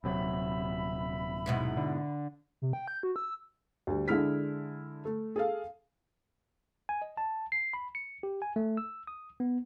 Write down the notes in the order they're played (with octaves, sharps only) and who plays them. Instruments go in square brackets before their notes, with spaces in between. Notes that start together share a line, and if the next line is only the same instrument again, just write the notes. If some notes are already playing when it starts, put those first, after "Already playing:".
[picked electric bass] D#1 C3 F#3 [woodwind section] E5 B5
[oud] G#2 B2 E4
[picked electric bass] D3
[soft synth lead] C3
G5
G6
F#4
E6
[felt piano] D2 G3
D3 G#3 E4 F6 B6
A3
G#4 A4 F5
[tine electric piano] G#5
D#5
A5
C7
B5
C#7
G4
G#5
A3
E6
D#6
B3